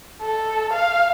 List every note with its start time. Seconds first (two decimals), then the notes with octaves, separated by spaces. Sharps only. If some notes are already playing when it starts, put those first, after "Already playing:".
0.22 A4
0.73 F5